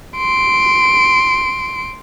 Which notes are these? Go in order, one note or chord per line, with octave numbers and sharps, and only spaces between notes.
C6 D7